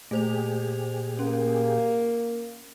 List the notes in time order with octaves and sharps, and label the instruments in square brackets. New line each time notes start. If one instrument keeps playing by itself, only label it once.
[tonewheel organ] A#2 G4 G#4 [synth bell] A3 C5 F7
[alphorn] A#3 [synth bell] C#4